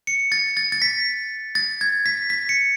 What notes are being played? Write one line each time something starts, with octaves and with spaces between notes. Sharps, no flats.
C#7
A6
A6
A6
B6
A6
G#6
B6
B6
C#7